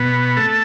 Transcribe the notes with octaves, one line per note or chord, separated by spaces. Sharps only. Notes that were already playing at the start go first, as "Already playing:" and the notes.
Already playing: B2 B3
A3 A4